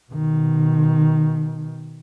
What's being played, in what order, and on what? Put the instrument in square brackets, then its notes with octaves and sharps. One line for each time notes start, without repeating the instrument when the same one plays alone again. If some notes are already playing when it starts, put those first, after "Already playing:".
[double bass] B2 D#3